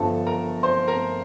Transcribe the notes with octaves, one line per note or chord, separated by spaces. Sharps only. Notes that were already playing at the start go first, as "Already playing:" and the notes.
Already playing: G1 G2 F3 A4 A5
A#4 A#5
C5 C6
A#4 A#5